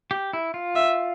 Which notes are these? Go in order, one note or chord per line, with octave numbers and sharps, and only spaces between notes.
G4
E4
F4
E5